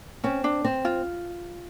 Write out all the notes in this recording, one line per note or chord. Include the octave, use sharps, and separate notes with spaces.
C4 C#4
D4
C4
F4